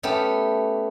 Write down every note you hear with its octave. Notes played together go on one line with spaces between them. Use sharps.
A3 B3 C#4 G4